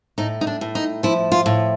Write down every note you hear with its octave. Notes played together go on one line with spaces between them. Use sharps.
A2 D#4
D#4
D4
A2
D#4
F3 E4
F4
A2